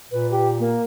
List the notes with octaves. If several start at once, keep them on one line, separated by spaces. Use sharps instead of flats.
A#2 B4
G4
A#3